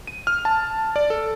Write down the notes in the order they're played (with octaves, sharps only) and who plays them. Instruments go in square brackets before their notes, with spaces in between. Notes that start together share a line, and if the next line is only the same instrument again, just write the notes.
[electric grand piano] D#7
F6
A5
D5
A4